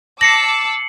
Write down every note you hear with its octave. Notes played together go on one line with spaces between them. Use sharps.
A5 D6 E6 A#6 C7 C#7 F#7